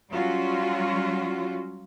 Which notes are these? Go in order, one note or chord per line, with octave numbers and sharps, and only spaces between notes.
F#3 G3 C#4 F4 F#4